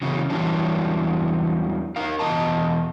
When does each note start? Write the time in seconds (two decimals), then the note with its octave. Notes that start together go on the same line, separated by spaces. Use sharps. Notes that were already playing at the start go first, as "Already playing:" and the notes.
0.02 C#3 E3 F#3 B3 C#4
0.30 E2 E3 F#3 G3 C#4 D4
1.96 D#4 A#4 F5
2.19 E2 B2 D#5 A5 A#5